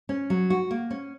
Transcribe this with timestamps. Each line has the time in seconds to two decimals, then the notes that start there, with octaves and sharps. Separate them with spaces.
0.09 C#4
0.30 F#3
0.50 F#4
0.71 A#3
0.90 C#4